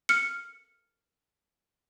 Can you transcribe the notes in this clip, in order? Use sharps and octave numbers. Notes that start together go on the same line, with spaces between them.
F6 C#7